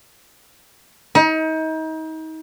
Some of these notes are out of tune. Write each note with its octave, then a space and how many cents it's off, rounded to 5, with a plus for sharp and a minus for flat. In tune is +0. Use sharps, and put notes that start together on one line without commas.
D#4 +35